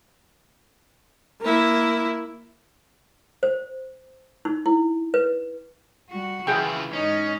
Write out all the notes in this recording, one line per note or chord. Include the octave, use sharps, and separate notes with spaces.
A#3 E4
C5
D#4
E4
B4
G3 F#4
C#3 E3 E4 F4 G#4 G5
G#2 C#4 D#4